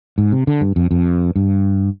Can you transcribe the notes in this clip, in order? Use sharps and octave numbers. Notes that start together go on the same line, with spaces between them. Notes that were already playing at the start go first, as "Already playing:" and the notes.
G#2
C3
D3
G2
F2
F2
G2